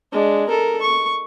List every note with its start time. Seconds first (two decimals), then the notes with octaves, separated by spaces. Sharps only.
0.12 G#3 D4
0.48 A4 A#4
0.82 C#6